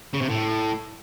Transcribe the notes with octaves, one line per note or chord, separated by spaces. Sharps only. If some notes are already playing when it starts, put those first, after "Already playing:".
C#3
C3
A2